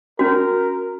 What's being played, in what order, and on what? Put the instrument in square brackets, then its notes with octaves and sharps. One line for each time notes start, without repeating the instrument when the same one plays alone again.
[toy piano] C#4 F#4 [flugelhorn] A#4